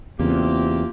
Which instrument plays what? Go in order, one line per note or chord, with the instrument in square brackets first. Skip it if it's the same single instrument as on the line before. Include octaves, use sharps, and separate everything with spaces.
[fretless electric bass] E2 C#3 [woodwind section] A#3 F4 G4 [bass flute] C4